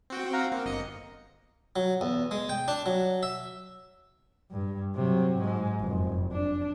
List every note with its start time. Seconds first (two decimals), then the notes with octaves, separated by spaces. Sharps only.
0.10 C4 F#4 G5
0.33 F5 F#5 A#5
0.52 A#3 C4
0.65 G1 D#5 C#7
1.76 F#3
2.01 E2
2.31 G#3
2.49 G5
2.68 D4
2.86 F#3
3.23 E5
4.51 G2
4.95 C3 F#3
5.38 G#2
5.80 F1 F#2
6.32 D4